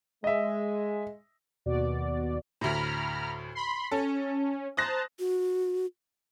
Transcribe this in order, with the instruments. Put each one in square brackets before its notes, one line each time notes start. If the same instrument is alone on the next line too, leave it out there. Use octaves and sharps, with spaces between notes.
[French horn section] G#3 [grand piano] D#5 E5
[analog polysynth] D#2 B2 F#4 D5
[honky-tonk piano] D2 A2 [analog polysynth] A#5 B5 F6
[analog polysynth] B5 C6
[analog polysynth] C#4 [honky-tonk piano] A4
[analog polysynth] C5 A5 A#5 [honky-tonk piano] D#6 F#6 A#6
[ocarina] F#4